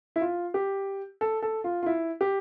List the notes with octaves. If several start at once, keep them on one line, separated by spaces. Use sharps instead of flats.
E4
F4
G4
A4
A4
F4
F4
E4
G4